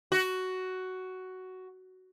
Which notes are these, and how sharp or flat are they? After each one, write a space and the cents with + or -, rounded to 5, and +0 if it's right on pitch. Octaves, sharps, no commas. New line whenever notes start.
F#4 +10